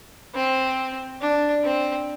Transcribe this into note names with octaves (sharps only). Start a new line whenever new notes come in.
C4
D4
C4